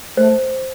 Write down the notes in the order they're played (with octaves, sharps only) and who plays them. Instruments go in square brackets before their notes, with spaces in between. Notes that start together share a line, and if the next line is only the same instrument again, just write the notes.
[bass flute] A3 [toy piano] C5